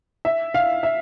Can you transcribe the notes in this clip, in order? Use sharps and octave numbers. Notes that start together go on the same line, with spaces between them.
E5
F5
E5